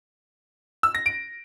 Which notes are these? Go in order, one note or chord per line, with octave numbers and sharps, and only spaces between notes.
E6
A#6
D7